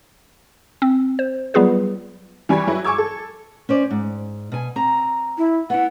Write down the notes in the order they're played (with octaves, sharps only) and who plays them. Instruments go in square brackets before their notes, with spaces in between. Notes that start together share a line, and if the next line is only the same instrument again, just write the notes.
[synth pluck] C4
C5
F#3 G3 B3 F4 G#4 B4
[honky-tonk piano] E3 G3 G#5 B5 C#6 G#6
F#3 E4 B4
G#5 C#6 D6 E6 G#6
A4
[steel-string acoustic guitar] C#4 C5 D5
G#2
B2 G#5
C4 A#5
[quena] E4
[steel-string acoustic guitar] B3 E4 [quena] F#5